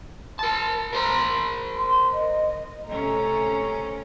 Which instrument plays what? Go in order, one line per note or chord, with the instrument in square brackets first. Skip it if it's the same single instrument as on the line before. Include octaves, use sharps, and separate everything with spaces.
[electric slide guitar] A#4 A5
A#4 C5 A#5
[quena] C6
D#5
[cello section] C3 C#4 [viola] A3 A#5